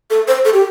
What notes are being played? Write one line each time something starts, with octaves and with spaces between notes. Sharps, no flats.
A4
C5
A4
G4